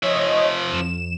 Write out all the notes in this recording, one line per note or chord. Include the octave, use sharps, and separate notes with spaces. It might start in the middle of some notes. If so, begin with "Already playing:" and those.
F3 C#5 D#5 E5
F2 E7